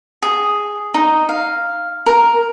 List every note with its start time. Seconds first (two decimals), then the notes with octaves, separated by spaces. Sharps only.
0.22 G#4
0.94 D#4
1.29 F5
2.06 A#4